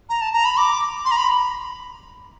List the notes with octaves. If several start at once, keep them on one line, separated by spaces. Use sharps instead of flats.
A#5
A5
A#5
B5
D6
C6
A#5
B5